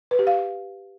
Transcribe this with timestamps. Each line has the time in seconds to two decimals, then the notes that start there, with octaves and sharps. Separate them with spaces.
0.11 B4
0.19 G4
0.27 F5